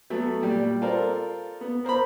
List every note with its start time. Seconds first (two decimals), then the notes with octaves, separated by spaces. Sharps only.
0.10 F#3 A3 B3
0.41 A#2 G3
0.82 F4 A4 A#4 C5 D5
1.61 B3
1.85 A#4 C5 A#5 B5